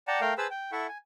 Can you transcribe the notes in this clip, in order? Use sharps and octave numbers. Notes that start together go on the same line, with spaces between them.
D5 F#5 G5 A5 A#5
A3 A#4 F5 G5
G#4 B4 C5 A5 B5 E6
G5
E4 A4 E5 F#5 C#6
G#5